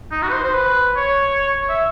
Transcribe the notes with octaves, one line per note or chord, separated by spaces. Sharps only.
D#4
F#4
B4
C5
C5
B4
C#5
E5